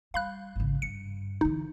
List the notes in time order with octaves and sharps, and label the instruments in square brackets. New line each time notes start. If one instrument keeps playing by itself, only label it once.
[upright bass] G3 [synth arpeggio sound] F5 B5 F#6
[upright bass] G#1 C#3
[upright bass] G2 [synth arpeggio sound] C#7
[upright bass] D3 E3 [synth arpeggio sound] D#4